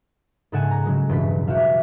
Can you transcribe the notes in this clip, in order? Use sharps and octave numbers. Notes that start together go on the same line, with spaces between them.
G#2 C#3 A4 F#5 G#5 E7
A#5
C#3 F#3 G#3
E1 G2 B2 B6
F#4 G4 E5 F5